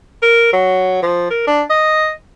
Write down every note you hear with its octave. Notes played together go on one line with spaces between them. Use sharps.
A#4
F#3
F3
A#4
D4
D#5